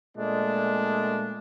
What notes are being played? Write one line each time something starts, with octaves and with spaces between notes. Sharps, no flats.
A#2 G#3 A3 D4